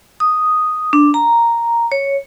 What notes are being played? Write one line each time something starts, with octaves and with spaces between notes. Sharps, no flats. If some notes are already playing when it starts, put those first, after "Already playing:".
D#6
D4
A#5
C#5